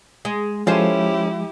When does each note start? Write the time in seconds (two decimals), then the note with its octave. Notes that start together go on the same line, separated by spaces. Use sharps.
0.25 G#3
0.67 F3 G#3 C#4 E4 G4 A4 C5